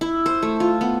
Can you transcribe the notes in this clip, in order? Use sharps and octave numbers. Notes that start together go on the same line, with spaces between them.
E4
C5
A3
F4
B3